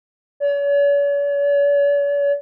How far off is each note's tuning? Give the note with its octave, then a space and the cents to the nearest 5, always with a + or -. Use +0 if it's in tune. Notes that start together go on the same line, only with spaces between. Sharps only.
C#5 +45